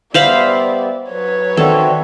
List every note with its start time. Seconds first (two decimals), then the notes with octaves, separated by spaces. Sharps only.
0.14 G3 B3 C5 D5 E5 F5 B5
1.10 F#3 B4 C#5
1.57 D#3 C4 F#4 A4 D5 E5